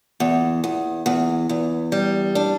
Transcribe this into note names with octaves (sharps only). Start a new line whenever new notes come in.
E2
E2
E2
E2
G3
D4